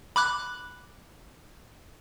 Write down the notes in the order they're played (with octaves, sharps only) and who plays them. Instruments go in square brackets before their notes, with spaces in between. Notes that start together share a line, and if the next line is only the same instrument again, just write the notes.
[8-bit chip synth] B5 D6 F#6